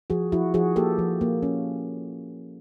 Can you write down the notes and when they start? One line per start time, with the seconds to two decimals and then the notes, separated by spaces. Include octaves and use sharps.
0.10 F3 F#4 G#4
0.32 F3 E4 F#4
0.54 F3 F#4 G#4
0.76 A#3 G4 A4
0.99 F3
1.21 A#3
1.43 C#4